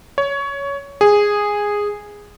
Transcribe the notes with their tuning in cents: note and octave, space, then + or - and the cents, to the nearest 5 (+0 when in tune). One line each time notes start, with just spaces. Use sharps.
C#5 +15
G#4 -10